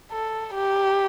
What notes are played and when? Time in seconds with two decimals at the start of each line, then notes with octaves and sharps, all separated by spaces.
0.12 A4
0.55 G4